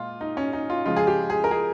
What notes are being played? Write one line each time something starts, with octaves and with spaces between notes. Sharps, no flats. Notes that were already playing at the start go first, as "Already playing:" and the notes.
Already playing: A#2 G#3 F4
D#4
C#4
D#4
F4
C#3 F3 G#3 F4
G#4
G4
G#4
A#4
G#4